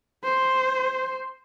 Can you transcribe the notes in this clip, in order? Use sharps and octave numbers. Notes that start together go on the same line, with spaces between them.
C5